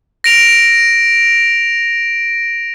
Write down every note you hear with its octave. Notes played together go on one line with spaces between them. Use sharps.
A#6 D7 F7